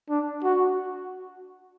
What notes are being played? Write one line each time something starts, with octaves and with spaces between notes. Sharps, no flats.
D4
F#4